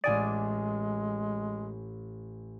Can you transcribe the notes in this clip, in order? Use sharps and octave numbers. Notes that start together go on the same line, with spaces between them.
A1 G#3 D5 G#5 D#6